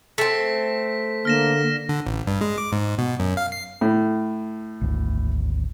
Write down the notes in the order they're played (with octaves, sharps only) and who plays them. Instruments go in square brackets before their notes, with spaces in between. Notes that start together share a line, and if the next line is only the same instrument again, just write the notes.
[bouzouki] A3 C4 [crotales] B6
[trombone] D3 [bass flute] A#3 [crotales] F6 A#6 E7
[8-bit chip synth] D3
A1
G2
G#3
D6
G#2
B2
F#2
F5
C7
[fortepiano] A2
[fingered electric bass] G#1 D2